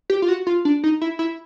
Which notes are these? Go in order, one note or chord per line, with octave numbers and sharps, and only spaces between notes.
G4
F4
F#4
F4
D4
D#4
E4
E4